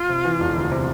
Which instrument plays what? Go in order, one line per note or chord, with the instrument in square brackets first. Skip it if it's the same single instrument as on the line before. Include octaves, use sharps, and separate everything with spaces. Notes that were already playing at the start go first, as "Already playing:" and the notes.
Already playing: [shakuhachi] F4
[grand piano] C3
E3
E1
D2
C3